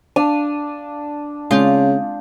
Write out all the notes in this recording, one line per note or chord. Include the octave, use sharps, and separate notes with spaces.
D4 F5 D#7
C#3 G#3 C4 F4 G6